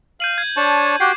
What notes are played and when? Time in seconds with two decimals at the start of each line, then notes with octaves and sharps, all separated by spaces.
0.20 F5 G6 D#7 F#7
0.38 G#6
0.57 D4 C#5 A5
1.00 F#4 G4 G5 D6 C7